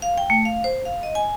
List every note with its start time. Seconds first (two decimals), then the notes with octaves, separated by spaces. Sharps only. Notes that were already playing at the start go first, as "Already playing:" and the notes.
0.02 F5
0.18 G5
0.30 A3
0.45 F5
0.64 C5
0.85 F5
1.03 D#5
1.15 G#5